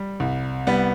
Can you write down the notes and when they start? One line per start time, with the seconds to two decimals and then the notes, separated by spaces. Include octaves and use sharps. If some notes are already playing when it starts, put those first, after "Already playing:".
Already playing: G3
0.20 C2
0.67 G3 B3